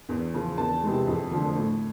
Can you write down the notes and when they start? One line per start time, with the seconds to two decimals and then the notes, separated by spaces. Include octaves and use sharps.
0.09 E2
0.34 C#3 F3
0.58 E2 A5
0.83 C3 E3 G#3
1.07 F2
1.31 D3 F3 A3
1.55 A2